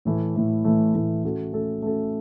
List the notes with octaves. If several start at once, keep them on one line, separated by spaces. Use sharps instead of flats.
A2 E3 A3
A2 E3 A3
A2 E3 A3
A2 E3 A3
A3 C#4 F#4 A4
A3 C#4 F#4 A4
A3 C#4 F#4 A4